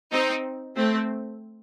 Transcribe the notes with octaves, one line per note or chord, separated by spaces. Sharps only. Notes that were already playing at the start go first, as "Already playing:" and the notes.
C4 D#4
A3 C4